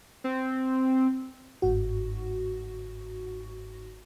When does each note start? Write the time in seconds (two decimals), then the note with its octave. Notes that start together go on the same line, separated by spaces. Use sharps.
0.24 C4
1.62 G1 G#2 F#4